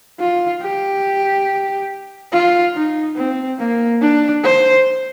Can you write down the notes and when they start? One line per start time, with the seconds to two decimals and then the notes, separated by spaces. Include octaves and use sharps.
0.20 F4
0.62 G4
2.32 F4
2.75 D#4
3.17 C4
3.59 A#3
4.01 D4
4.44 C5